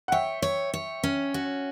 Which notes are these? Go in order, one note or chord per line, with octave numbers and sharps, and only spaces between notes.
F#5
C#5 E5 G5
C#5
C#5
C#4
F#4